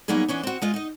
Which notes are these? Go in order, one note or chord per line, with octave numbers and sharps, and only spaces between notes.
F#3 G3 A#3 B3 D#4 G#4
E3 B3 C#4 D4
C4 F#4
G#3 F4 D#5
D#4 D#5